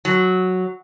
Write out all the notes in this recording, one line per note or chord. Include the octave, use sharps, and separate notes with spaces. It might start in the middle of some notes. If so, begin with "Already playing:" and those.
F#3